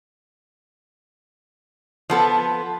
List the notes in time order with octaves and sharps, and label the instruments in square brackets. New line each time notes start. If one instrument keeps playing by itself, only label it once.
[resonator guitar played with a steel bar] F3 B3 A4